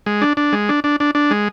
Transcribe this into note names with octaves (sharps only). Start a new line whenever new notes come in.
G#3
D4
D4
G#3
D4
D4
D4
D4
G#3